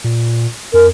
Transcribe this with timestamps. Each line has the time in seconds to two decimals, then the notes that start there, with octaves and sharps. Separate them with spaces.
0.04 A#2
0.74 F2 A#4